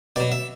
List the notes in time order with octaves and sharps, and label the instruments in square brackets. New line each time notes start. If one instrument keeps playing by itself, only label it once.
[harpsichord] B2 F#3 D5
E5